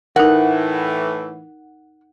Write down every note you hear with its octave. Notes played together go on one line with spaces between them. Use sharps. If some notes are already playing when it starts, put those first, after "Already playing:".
A2 E3 D#4 A#4 F#5